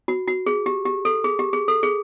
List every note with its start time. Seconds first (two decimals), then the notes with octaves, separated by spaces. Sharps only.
0.08 F#4
0.27 F#4
0.47 G#4
0.66 G4
0.85 G4
1.05 A4
1.24 G#4
1.39 G4
1.53 G#4
1.68 A4
1.83 G#4